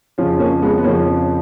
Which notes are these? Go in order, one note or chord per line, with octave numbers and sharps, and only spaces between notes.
F2 C#3 F3 C#4 F4
A#3 C#4
G#3 B3
B3
F2 C#3 F3 A#3 C#4